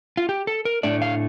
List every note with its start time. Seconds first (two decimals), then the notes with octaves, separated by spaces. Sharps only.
0.17 F4
0.29 G4
0.47 A4
0.65 A#4
0.83 A2 A3 D4 D5
1.02 F5